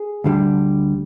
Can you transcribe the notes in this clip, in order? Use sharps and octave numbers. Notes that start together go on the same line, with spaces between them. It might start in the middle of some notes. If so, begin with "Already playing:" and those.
Already playing: G#4
D2 D3 G3